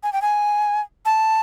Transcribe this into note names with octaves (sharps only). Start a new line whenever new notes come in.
G#5
G5
G#5
A5